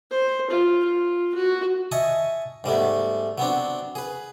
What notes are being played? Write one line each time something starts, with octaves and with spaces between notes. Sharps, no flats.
C5
F4
F4
F#4
D#5 E5 G#5 A5 C#6 D#6
G#2 G3 A3 B3
F#3 B3 C4 D4
G#4 B4